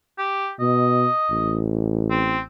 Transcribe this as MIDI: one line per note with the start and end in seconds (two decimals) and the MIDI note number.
0.18 0.50 67
0.60 1.07 47
0.60 1.55 75
1.30 2.47 33
2.11 2.40 60